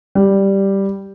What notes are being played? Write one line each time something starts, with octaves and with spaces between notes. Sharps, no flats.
G3